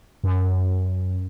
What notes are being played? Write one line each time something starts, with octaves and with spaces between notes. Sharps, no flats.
F#2